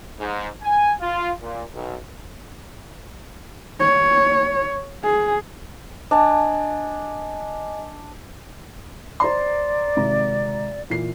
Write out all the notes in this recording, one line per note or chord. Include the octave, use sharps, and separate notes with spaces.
G#2
G#5
F4
A#2
B1
C#5
G#4
D4 D#5 G#5
C5 D5 A#5 C6
G#1 C3 A#5
A#2 E3 C7